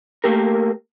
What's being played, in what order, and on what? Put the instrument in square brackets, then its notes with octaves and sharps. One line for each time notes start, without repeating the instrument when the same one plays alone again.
[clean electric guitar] A3 A#3 G4 A#4